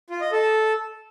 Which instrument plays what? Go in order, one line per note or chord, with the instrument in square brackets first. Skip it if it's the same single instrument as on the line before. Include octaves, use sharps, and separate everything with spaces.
[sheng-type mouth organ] F4
D#5
A4